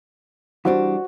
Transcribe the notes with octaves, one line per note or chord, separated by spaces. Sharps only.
E3 G3 D4 F#4 C5